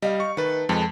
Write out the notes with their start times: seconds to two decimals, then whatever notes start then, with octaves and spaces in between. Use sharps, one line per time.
0.02 G3 D#4 F5
0.20 C#6
0.37 D#3 A3 B4
0.69 F2 G#3 A4 B4